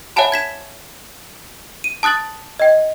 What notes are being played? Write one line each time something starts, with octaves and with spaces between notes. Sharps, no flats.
C#5 E5 F#5 G#5 A5 B5
G#6 B6 E7
D#7
A5 D#6 F#6 A6 F#7
D#5 G5